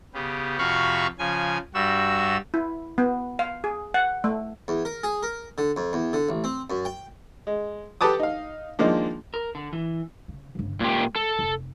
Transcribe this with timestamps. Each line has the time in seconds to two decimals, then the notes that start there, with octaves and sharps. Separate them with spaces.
0.14 C#3 B3 G4
0.58 F2 C3 F#4 F5 B5 C#6
1.19 C#3 F3 G#5 G#6
1.74 G2 G3 F#4 E6
2.54 E4
2.98 B3
3.39 F5
3.64 G#4
3.94 F#5
4.24 A3
4.68 E2
4.85 A#4
5.03 G#4
5.23 A#4
5.58 D3
5.77 F2
5.93 E2
6.13 D3
6.29 A1
6.44 C4
6.70 F#2
6.85 G5
7.47 G#3
8.01 G4 A4 B4 A5 D6 D#6
8.19 D#4 F5
8.79 D#3 F3 G#3 A#3 D4
9.34 A#4
9.55 D3
9.73 E3
10.28 C#3
10.55 G1 C#3
10.80 A#2 G#3 G4
11.16 A4
11.39 F1